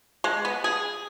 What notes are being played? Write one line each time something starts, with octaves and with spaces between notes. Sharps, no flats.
G#3
B3
G#4